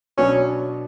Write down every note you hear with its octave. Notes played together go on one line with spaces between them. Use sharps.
B2 F#3 B3 C#4 D4 F#4